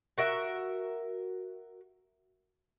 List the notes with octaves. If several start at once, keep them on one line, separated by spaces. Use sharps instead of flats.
F#4 A#4 E5